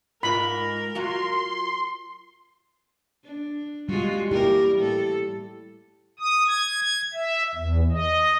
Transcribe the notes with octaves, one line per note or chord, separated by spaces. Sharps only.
G#2 F4 A#4 B5
F#3 F4 F#4 C6
D4
G3 G#3 F4 F#4
G3 A#3 E4 G4 A#4
A2 A4
D#6
G#6
G#6
E5
E2
D#5